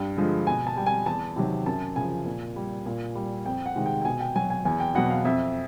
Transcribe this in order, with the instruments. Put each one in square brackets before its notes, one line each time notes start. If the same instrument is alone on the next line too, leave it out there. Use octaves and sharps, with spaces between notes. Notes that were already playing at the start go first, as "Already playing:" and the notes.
Already playing: [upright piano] G2 G5
D3 F3 G#3
B2 G#5
A5
G3 G5
G#5
E2 A5
C3 D#3 F#3
F#2 A5
C#3 F3 G#5
A#2
G3
A#2
G3
F2 G5
F#5
C3 D#3 G#3
G5
G5
B2 G#5
G5
F#3 G#5
G#5
E2 G#5
G5
B2 F#3 F#5
F5
F2 E5